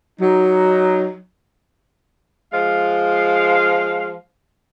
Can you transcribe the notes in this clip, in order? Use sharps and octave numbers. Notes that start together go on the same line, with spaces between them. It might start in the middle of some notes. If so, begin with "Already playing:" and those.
F#3 D#4
F3 G#3 F5